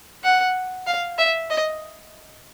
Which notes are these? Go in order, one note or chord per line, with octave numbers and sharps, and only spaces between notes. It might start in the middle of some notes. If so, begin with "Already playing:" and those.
F#5
F5
E5
D#5